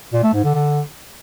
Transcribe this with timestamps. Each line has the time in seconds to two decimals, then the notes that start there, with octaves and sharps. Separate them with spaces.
0.13 A#2
0.23 A3
0.34 G#2
0.44 D3
0.54 D3